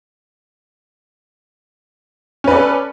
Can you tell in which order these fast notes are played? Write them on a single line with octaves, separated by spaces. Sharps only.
C#4 B4 D5 A4